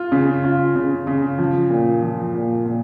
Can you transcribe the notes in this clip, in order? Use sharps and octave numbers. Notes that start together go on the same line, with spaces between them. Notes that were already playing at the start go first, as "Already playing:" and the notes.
Already playing: F4
C#3
F4
C#3
C#3
F3
A#2
F3
A#2
A#2